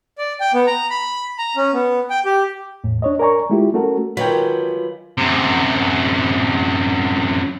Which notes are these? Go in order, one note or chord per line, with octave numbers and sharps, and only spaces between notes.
D5
G5
B3
A#5
B5
A#5
C#4
B3
G5
G4
E2 A2
D4 C#5 D#5
A#4 D5 G#5 A#5 C#6
G#3 A3 E4 F4 G4
A3 C#4 F#4 A4 A#4
D#3 F#3 E4 F4 B4 G5 B6
F#2 C3